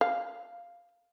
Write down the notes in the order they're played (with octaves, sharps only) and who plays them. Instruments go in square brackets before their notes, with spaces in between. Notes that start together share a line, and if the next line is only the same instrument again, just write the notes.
[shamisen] F5